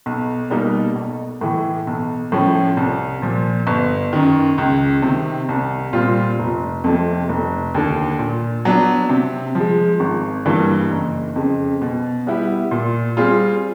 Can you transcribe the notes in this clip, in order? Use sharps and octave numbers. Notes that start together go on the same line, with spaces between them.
B1
B2 G3 A#3 D#4
B1
A2 E3
B1
A2 F3 A3 C#4
C2
A#2 F3
G1
F#2 D#3
C#2
C3 D#3
C2
A#2 G3 C4 F4
F1
F2 C3 F3 A3
F1
D#2 D3
A#2
F#3 B3 D4
C3
F3 G#3
G#1
G2 E3 G3 A#3
F#1
F2 C#3
B2
G3 B3 E4 G4
A#2
G3 C4 F4 G#4